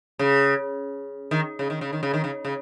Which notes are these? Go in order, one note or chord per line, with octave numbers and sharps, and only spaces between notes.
C#3
D#3
C#3
D#3
C#3
D#3
C#3
D#3
C#3
C#3